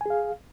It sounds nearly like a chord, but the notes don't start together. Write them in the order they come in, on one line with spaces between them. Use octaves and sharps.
G#5 G#4 F5